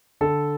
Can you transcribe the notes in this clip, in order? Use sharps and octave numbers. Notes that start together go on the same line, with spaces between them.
D3 A4